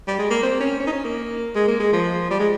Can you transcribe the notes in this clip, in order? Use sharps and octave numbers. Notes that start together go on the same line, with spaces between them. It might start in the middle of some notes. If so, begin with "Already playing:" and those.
G3
G#3
A#3
C4
C#4
C#4
D#4
C#4
A#3
G#3
A#3
G#3
F3
G3
G#3